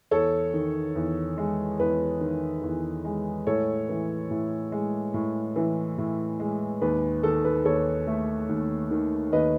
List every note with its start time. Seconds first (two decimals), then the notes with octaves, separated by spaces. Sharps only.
0.11 E2 A4 C#5
0.54 D#3
0.95 E2
1.38 G#3
1.79 E2 B4
2.21 D#3
2.63 E2
3.05 G#3
3.47 A2 A4 C#5
3.89 E3
4.31 A2
4.72 G#3
5.14 A2
5.56 E3
5.98 A2
6.40 G#3
6.82 D#2 B4
7.23 D#3 A4
7.45 B4
7.65 D#2 A4 C#5
8.07 A3
8.49 D#2
8.91 D#3
9.33 D#2 B4 D#5